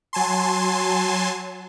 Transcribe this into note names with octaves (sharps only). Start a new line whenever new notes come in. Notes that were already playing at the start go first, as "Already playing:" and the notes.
F#3 G#5 A5 C6